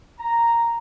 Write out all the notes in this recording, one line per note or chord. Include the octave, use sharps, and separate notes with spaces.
A#5